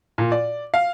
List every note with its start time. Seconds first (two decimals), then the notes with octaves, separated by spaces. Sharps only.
0.18 A#2
0.32 D5
0.74 F5